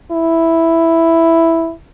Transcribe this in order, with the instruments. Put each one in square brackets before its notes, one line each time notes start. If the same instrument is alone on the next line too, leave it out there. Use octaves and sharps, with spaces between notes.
[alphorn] E4